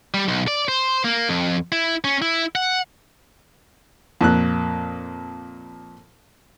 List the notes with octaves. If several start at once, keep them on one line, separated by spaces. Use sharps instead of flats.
G3
B1
D5
C5
A#3
F2
E4
C#4
E4
F#5
F2 A#2 F#6